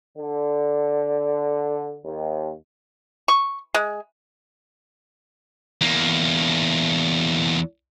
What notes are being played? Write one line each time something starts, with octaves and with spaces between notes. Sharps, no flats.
D3
D#2
C#6
G#3
E2 A#3